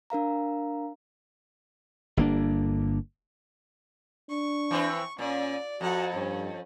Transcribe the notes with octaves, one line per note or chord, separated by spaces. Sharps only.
D4 A#4 F5 A#5
G1 A#3 D4
D4 C#6
E3 C4 B4
A#2 C#4 D5
F2 F#4 F#5 A#5
G2 C#4